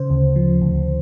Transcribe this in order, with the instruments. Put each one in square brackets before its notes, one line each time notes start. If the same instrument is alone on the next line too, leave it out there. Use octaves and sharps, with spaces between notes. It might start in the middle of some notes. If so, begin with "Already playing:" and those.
Already playing: [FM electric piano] C#3 C5
D2
F3
D2